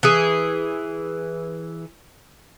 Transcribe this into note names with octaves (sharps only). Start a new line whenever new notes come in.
E3 G#4